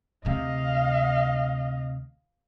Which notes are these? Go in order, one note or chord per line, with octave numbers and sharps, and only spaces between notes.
D2 C3 D#5 F5